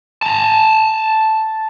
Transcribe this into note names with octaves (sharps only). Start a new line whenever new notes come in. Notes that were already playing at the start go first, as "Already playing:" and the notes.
A5 A#5